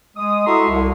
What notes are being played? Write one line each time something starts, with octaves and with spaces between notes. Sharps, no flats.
G#3 D#6
E4 F#4 A4 A#5 C6 C#6
C2